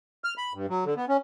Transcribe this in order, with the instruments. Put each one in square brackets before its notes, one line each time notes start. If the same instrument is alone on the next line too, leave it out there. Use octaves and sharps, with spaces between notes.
[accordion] F6
B5
G2
F#3
D3
B3
C#4